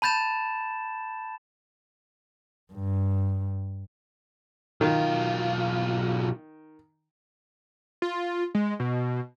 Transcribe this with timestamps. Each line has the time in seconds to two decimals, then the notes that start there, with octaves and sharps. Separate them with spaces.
0.02 A5 B5 G6 A6 E7
2.73 G2
4.81 B1 D#3 F4
8.02 F4
8.55 G#3
8.80 B2